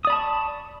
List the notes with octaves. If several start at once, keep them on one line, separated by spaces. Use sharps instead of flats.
D5 A5 B5 C#6 D#6